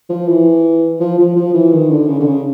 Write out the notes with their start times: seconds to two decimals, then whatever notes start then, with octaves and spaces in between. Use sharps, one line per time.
0.09 F3
0.28 E3
1.00 F3
1.18 F3
1.36 F3
1.54 E3
1.72 D#3
1.90 D3
2.08 C#3
2.20 D3
2.26 C#3